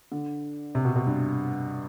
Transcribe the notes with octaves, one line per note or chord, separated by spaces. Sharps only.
D3
C3
B2
B2
G2